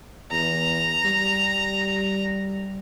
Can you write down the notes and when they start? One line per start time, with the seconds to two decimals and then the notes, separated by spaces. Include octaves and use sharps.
0.31 E2 A#5
1.05 G3